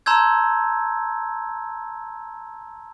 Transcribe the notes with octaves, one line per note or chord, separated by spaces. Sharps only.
A5 A#5 C6 E6 G6 G#6